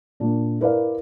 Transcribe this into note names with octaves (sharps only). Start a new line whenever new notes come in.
A#2 D4
E4 A#4 B4 D5 F5